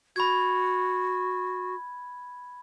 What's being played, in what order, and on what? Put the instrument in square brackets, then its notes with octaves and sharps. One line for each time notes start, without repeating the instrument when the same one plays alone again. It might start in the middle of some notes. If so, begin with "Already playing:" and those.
[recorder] F#4 [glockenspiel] B5 G#6